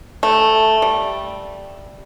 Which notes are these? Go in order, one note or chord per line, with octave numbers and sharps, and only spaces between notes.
A3
G3